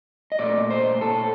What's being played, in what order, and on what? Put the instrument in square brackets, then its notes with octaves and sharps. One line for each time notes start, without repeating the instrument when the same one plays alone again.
[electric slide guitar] D#5
A#2 A3 D5
C5
A4